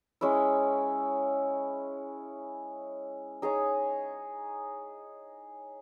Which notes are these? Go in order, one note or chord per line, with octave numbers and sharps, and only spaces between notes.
G#3 C#4 E4
D#4 G#4 C#5